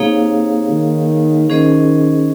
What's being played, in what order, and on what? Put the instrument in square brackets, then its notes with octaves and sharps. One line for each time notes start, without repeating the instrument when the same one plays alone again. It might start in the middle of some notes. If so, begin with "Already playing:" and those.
Already playing: [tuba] C3 [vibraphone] A#3 D#4 G#4 C#5 F5
[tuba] D#3
[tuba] D#3 [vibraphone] C#4 G#4 C5 D#5